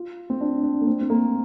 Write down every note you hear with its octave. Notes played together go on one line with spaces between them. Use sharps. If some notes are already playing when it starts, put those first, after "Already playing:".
Already playing: F4
C4
D4
D4
A#3
C4
C4
A#3